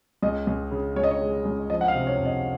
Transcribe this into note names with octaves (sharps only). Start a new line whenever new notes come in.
C#2 D#5
C#2
C#3
C#2 C#5
D#5
C#5
G#3
C#2
F3 D#5
F#5
F5
C3
C#5
F2
D#5